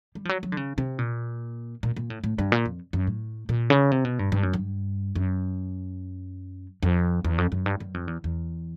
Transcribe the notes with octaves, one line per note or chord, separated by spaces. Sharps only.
G3
F3
F#3
F#3
D3
C#3
C3
A#2
A#2
A#2
A2
A2
G2
A#2
F2
F#2
A2
A#2
C#3
C3
B2
G2
G2
F#2
G2
F#2
F2
E2
F2
F#2
G2
F#2
F2
E2
E2